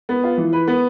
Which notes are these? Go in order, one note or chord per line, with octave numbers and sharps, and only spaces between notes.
B3
F4
E3
B4
B3